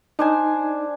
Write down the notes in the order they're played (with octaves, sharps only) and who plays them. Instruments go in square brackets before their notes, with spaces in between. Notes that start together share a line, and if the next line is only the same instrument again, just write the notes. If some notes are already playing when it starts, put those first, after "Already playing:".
[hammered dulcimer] D4 C5 G#5 [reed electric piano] D#4